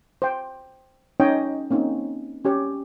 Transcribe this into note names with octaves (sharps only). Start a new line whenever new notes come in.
C5 G5
C#4 D#4 C#5 D#5 G5
A#3 C4 C#4 D#4
C#4 G4 C#5